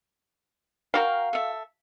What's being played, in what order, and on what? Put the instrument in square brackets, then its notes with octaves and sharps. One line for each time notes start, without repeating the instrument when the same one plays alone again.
[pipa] F#4 F5 [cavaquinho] A#4 G5
[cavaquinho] A4 E5